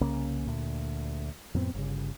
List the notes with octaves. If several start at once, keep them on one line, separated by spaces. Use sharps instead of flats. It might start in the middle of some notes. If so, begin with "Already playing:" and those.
C2 C#3 A#3 C#4
D2 A#2
F2 A2 B3 C4
G1 C#3